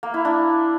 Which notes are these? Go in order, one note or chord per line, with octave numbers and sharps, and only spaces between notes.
A#3
E4
D4